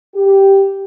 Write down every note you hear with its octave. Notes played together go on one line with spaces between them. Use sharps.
G4